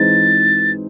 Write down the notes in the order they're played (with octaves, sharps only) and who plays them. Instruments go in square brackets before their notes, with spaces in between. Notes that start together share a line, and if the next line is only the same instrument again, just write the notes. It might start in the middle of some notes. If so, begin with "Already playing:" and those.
Already playing: [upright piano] E3 G#3 C4 D#4 [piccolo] A6